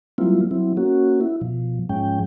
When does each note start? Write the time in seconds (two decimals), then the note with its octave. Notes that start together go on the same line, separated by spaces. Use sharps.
0.18 F#3 G3 A#3 C4 E4 F4
0.51 F#3 C4 E4
0.77 A#3 C#4 F#4
1.21 E4
1.42 B2 F3
1.89 G#2 F3 G#3 C#4 G5